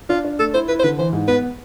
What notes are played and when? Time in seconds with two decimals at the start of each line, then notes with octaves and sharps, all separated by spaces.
0.09 D4 F4
0.24 D4
0.39 A3 A4
0.54 E4 C5
0.68 E4 B4
0.79 C5
0.83 D3 B4
0.98 E3 C5
1.13 G#2
1.28 B3 B4